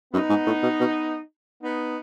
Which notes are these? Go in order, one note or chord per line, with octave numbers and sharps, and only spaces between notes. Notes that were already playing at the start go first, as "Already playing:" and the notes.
F#2 B3 D#4
G#2
A2
B2
B2
B3 D#4